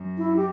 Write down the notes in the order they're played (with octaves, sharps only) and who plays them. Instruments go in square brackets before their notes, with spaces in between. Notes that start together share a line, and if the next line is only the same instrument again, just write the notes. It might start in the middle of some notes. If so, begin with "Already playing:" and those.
Already playing: [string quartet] F#2
[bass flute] E4
G4